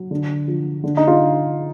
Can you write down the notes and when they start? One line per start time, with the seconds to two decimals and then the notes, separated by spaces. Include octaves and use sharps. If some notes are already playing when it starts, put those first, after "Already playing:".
Already playing: F#3
0.11 D3
0.48 F3
0.84 D3
0.97 D#4
1.07 F4